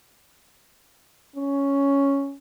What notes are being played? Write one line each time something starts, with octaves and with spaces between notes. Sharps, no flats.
C#4